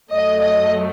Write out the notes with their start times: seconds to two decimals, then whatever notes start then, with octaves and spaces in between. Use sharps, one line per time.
0.11 F#2 F#3 A3 D#5
0.41 D#5